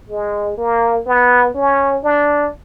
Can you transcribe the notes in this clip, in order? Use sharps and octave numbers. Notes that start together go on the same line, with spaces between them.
G#3
A#3
B3
C#4
D4